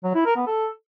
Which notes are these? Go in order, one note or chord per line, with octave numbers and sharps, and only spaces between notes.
F#3
E4
A#4
B3
A4